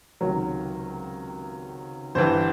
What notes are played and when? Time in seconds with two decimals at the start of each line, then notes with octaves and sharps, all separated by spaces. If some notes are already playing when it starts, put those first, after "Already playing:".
0.21 C#2 C3 D#3 F#3 A#4
2.15 G1 G2 E3 C5